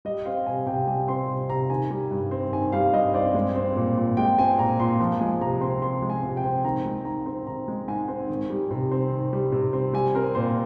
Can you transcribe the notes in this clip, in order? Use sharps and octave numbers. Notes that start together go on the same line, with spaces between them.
G3 D#5
C4 F5
C3 G#5
C3 G5
G3 G#5
C4 C6
C3
C3 A#5
D#3 G#5
G3
G2
C4
D#3 G#5
G3 F5
G2 D#5
C4 D5
G#3
C4
A#2
A#2
G#3 G5
C4 G#5
A#2 A#5
A#2 C6
F3
G#3 G#5
C3 A#5
C4 C6
F3 C6
G#3
G#5
C3
G5
C4
D#3 A#5
G#3
G#2 A#5
C4
D#3 A#5
G#3
G#2 G#5
C4
D#3
G3
C3
C4
D#3
G3
C3
C4
G3 G#5
C4 A#4
A#2 C5